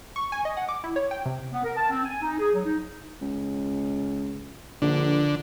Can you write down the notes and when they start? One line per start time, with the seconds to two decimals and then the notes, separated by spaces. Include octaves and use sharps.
0.16 C#6
0.32 G#5
0.45 D#5
0.57 F#5
0.69 D6
0.84 E4
0.96 C#5
1.11 G5
1.26 C3
1.53 B3
1.64 A#4
1.77 A5
1.90 C4
2.05 G#5
2.22 D#4
2.39 G#4
2.53 F#3
2.64 D#4
3.22 C#2
4.82 A#1 D3